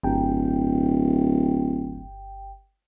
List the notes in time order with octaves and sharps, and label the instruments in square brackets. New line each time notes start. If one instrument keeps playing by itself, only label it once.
[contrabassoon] D1 [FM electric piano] G1 G5